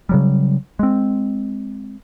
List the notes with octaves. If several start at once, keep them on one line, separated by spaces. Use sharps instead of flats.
C#3 F#3 G3
G#3 C4